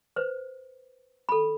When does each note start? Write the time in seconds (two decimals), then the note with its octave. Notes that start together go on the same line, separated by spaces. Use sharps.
0.16 B4 C5
1.29 A4 B5